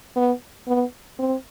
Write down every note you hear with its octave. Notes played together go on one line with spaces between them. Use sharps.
B3
B3
C4